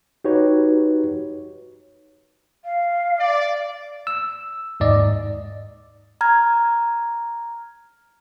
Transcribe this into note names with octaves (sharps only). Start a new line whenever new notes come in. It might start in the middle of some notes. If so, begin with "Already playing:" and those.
D#4 F#4 G4 B4 C#5
F5
D5
E6
D#2 G#2 D5 D#5
A#5 F6 G#6